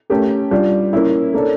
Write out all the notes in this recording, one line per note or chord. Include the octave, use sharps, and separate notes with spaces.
A3 C#4 G4 A#4
G3 D4 F4
A#3 C#4 E4
A#3 D4 A4 C#5